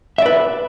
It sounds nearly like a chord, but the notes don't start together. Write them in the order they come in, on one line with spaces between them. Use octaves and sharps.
E5 D5 B4